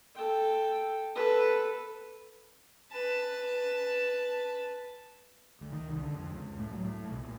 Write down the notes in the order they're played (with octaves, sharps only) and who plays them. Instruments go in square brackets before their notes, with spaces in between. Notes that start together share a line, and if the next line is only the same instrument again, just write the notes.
[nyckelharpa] A4 G5
A4 B4
[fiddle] B4 A5
[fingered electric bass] D2
D#3
C2
D3
F2
C#2
A2
F#3
A2
B1
A#1